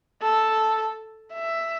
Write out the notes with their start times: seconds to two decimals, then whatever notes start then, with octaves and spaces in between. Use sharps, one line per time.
0.23 A4
1.34 E5